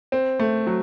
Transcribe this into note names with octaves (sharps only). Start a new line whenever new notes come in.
C4
A3
F#3